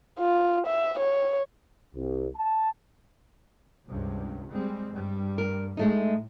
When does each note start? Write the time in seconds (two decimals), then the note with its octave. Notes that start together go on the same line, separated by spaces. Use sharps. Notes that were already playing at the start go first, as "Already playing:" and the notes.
0.19 F4
0.66 E5
0.99 C#5
1.95 C2
2.37 A5
3.86 C#2 G2 C3
4.51 G3 G#3 C4
4.92 G2 G3
5.38 A#4
5.77 A2 G#3 A3 D#4